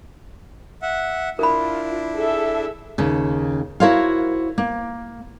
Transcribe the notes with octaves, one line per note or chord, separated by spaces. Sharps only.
E5 F#5
D4 E4 F4 A#4 B5
G#4 A4 E5
D#2 C#3
E4 F#4 A#4 C5 C#5 F5
A#3